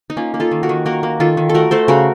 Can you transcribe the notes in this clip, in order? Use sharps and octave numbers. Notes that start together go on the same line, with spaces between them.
D#4
A#3 C#4 F4
A#3
F4 A4
D#3
F#4 A#4
D#3
A#3 F#4 A#4
A#3
D#3 F4 A4
D#3
A4
A3 F#4 A#4
A3 A4 C5
C#3 F#4 A#4